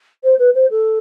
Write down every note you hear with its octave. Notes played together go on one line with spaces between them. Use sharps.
C5
B4
C5
A4